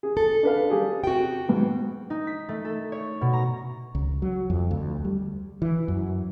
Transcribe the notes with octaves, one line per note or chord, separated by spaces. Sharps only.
G#4
A4
D4 B4 F5
G3 G4 G#4
C3 F#4 G5
G#2 B3
D#4
B6
A3
A4
C#5
B2
A#5
C#2
F#3
F2
D2
G3
E3
F#2